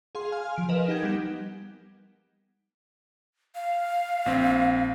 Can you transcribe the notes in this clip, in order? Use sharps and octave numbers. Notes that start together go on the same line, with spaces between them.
G#4 F5 C6
F5 G#5 F6
F3 D7
A#4 B4 D#5 E7
D#4 G4 F#5 G#6
G3 B3 G4
F5
A#1 C4